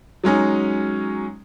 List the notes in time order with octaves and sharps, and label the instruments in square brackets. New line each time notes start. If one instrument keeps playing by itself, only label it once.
[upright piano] F#3 G#3 C#4 D#4